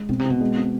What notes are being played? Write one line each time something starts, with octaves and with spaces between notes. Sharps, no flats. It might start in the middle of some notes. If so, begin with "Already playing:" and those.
Already playing: G#3
B2 C4
C3
C4
B2
G#3
C4